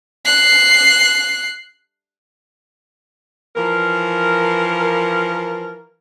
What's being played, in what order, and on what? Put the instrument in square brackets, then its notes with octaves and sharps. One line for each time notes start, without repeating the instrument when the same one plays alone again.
[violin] F#6 C7
[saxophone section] E3 F3 A#4